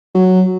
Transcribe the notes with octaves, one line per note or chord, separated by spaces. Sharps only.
F#3